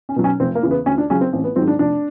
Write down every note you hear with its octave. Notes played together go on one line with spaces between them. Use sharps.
C#4
B2 F#3
C#4
F1 C4
A#3
E2 C#3 E3
B3
D2 C#4
D4
C#3 F#3 C#4
C4
A1 C4
B3
G#2 D#3 F#3 C4
D4
F1 D4